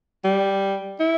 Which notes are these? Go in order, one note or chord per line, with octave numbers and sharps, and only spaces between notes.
G3
E4